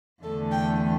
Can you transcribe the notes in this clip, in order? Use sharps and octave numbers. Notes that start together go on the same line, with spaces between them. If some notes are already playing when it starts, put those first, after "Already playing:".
E2 D3 A3 A4
G5